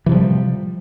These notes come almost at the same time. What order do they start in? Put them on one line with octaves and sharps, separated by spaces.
E3 C3 F3 G3